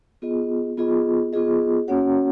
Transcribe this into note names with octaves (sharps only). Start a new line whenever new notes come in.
B3 F4 G#4 D#5
B3 F4 G#4 D#5
B3 F4 G#4 D#5
A#3 C#4 F#4 C#5 F#5